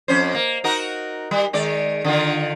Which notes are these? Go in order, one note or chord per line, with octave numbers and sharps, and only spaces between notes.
F2 C#4 C5
A#3
D#4 F#4 A#4
G3
D#3 G#3 D5
D3 D#3 F4